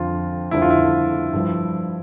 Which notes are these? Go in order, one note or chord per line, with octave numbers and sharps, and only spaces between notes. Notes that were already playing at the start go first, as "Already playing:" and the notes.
Already playing: F2 D3 F3 F4
F2 D3 F3 E4
F4
E4
G2 F3